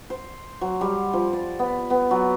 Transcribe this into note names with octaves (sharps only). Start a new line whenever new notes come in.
C5
F#3
G3
F3
D5
B3
B3
F#3